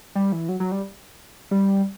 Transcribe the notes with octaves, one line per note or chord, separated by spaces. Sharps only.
G3
E3
F#3
F#3
G3
G3